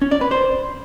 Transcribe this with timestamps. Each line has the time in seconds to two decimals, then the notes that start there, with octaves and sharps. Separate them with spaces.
0.02 C#4
0.11 D5
0.21 B4
0.31 C5